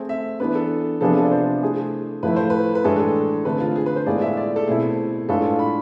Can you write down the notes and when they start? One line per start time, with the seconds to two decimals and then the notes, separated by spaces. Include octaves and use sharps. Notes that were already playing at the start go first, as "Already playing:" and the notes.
Already playing: A3 C4 G#4
0.09 E5
0.40 E3 B3 D4 B4
0.55 A4
1.01 C3 F3 B3 D4 G#4 A4
1.24 D5
1.31 C5
1.61 A3 E4 G#4
2.23 A2 F3 A3 E4 B4
2.36 C5
2.50 B4
2.75 B4
2.84 A2 E3 G#3 D4 G#4 A4
3.45 D3 A3 C4 B4
3.60 F4
3.76 G#4
3.86 B4
3.96 C5
4.06 A2 G#3 B3 F4 G#4 D5
4.22 E5
4.37 D5
4.56 A4
4.68 B2 A3 C4 E4 G#4
5.29 A2 G#3 D4 F4 A4 B4
5.59 B5